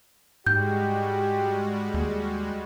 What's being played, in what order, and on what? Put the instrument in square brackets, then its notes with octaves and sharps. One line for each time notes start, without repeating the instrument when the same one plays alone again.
[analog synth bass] G#2 [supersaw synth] G3 G#3 F#4 [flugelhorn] G4 [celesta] G6
[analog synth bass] D#2